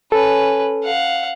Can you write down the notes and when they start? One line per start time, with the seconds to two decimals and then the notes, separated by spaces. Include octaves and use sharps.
0.12 C#4 A4 B4
0.84 F5 F#5